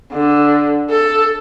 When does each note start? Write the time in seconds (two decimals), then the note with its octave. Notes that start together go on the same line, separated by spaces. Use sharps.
0.12 D3
0.91 A4